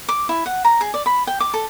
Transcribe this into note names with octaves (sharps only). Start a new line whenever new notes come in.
D6
E4
F#5
A#5
G#4
D5
B5
G5
D6
A4